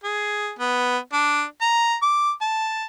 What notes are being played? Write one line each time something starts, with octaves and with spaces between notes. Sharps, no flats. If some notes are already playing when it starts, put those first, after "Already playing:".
G#4
B3
D4
A#5
D6
A5